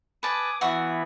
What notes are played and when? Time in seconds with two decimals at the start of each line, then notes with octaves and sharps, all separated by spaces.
0.23 B4 G#5 A5 D6 D#6
0.61 E3 B3 E4 F#4 E5